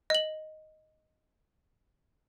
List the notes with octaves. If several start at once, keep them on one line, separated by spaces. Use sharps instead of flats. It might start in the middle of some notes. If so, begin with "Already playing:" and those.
D#5 F#7